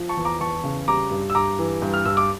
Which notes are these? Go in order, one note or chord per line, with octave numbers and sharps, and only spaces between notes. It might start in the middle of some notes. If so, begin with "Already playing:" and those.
Already playing: F3
A5 C#6
E2
A#5 D6
E2 A5 C#6
C#3
G3 A#5 D6
G2
E6
G2 A#5 D6
E3
G2
F6
G2 E6
D6